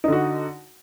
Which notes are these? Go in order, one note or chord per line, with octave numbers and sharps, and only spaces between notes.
D3 D#4 F#4